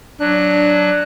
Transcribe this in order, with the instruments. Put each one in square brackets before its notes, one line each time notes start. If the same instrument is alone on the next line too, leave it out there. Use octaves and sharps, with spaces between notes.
[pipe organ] F#3 F#6 [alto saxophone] D4